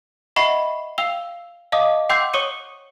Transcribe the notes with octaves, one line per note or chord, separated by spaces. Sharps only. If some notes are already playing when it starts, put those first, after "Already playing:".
D#5 E5 F#5 B5 C#6 C7
F5 G5 E6 F7 G7
D#5 F5 A5 D6 D#6
F#5 G5 C6 D6 E6 G6
C#5 C#6 D#6 C#7 D#7